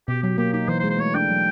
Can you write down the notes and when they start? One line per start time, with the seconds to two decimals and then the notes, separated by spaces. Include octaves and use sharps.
0.08 B2 G4
0.23 F#3 G4
0.38 A#3 G4
0.53 D#4 G4
0.68 E3 C5
0.79 C5
0.84 G#3
0.90 C5
0.99 A3 C#5
1.15 D4 G5
1.29 F#3